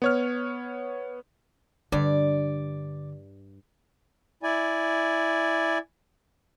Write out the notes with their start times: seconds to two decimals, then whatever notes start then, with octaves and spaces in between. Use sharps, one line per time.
0.02 B3 C#5 F6
1.92 G2 D3 D5
4.43 E4 D5 G#5